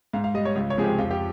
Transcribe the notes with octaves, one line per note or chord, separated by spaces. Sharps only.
G#2 F5
F5
G3 D#5
C#5
C#2
C#5
C3 F3 G#3 G#4
G4
F2 F4
G4